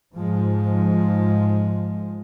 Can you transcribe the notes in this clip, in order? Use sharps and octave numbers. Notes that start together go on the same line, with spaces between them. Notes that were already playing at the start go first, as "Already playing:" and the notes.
G#2 F3 G#3